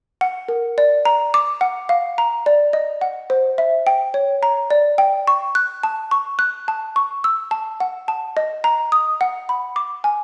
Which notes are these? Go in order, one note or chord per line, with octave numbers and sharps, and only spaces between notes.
F#5
A#4
D5
A#5
D6
F#5
F5
A#5
D5
D#5
F#5
C5
E5
G5
C#5
A#5
D5
G5
C#6
F#6
A5
C#6
F#6
A5
C#6
E6
A5
F#5
A5
D#5
A#5
D#6
F#5
B5
D6
G#5